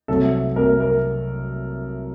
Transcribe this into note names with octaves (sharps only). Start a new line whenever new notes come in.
C2 C3 F#3 A3 A4
C2 C3 F#3 A3 A#4
A#4